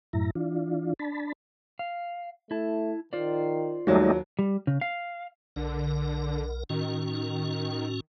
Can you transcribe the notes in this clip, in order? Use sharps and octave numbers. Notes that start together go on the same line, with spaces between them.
F#2 A2 E4 A#5
E3 D4 F4
D4 A5 B5
F5
A3 E4 A5
D#3 F4 C5 D5
D#2 G#2 F#3 G3 A3 D#4
G3
C#3
F5
B1 D3 A#4
A2 D#3 C#4 F#4